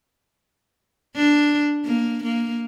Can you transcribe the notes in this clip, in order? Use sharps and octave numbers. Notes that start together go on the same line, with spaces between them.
D4
A#3
A#3